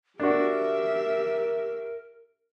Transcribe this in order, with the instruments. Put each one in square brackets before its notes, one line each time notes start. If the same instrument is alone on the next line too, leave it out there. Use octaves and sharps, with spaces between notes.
[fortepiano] D4 F#4 [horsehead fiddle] G4 E5 [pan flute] A#4